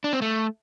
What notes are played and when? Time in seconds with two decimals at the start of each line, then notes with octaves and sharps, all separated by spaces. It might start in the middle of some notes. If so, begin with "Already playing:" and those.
0.04 D4
0.13 C4
0.22 A3